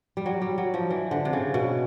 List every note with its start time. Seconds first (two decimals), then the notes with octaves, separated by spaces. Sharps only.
0.17 G3
0.26 F#3
0.42 G3
0.58 F#3
0.74 F3
0.91 E3
1.11 D3
1.25 C3
1.33 C#3
1.54 B2